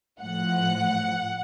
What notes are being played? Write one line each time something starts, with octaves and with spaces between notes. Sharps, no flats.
A2 F3 F#5